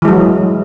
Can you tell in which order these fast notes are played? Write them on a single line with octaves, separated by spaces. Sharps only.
E3 G#3 F#3